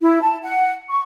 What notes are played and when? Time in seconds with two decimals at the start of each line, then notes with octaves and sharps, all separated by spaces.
0.01 E4
0.22 A5
0.42 F#5
0.89 C#6